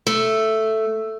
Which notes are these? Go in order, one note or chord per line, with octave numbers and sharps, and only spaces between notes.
A3